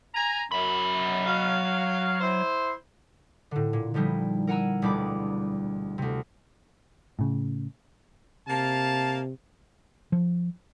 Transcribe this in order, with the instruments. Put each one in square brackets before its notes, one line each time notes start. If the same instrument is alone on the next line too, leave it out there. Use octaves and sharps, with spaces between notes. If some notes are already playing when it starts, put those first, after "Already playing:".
[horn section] G#5 A#5
[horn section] F#2 [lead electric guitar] F#3 B5
[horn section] F#4 F5
E4 C5
[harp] A2 D3
A#2
D3 F3 G3 D#4 E4
A#4 F#5 G#5 A#5 E6
E1 D2 G3 D4 B5 D6
D2 C3
[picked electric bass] A2 C#3
[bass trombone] C3 [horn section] A#3 F5 A5
[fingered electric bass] F3